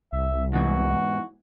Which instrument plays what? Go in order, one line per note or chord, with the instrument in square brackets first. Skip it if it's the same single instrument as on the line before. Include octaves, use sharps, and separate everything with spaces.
[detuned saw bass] C2 [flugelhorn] E5
[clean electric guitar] E2 G#2 E3 [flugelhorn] F#4